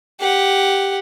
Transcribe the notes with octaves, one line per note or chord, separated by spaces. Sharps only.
G4 F#5